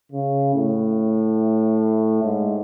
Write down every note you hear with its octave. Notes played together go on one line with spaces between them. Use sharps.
C#3
A2
G#2